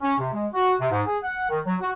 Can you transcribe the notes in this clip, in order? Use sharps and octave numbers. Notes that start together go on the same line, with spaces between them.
C#4
C3
G#3
F#4
C3
G#2
G#4
F#5
D#3
F#3
F#4